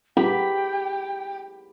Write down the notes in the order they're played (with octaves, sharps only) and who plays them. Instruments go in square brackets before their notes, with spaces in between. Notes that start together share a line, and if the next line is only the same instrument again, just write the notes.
[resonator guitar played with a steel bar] G4 [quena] G5 [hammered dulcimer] B5